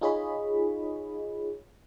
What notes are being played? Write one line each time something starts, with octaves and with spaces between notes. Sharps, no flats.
D#4 F4 G#4 C#5 D#5 B5